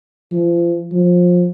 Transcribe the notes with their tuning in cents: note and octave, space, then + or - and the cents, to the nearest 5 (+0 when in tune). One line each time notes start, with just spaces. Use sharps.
F3 -35
F3 +20